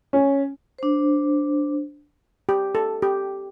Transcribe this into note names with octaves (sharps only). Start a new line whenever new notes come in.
C#4
D4 C5
G4
A4
G4